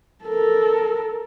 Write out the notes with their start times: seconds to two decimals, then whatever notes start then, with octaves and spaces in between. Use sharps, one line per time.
0.25 A4 A#4